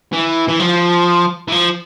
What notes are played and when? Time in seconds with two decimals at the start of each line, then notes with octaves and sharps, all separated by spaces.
0.13 E3
0.48 E3
0.60 F3
1.48 E3
1.52 F3